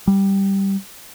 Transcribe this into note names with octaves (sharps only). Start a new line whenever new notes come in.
G3